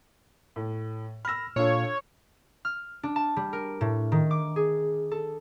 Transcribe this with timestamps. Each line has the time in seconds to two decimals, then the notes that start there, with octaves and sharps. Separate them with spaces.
0.56 A2
1.25 B5 E6 F6 A#6
1.56 A#2 D4 F4 A4 C#5 F5
2.65 F6
3.03 D4
3.16 A5
3.36 G3
3.53 A#4
3.81 A2
4.12 D#3
4.31 D6
4.56 G#4
5.11 A4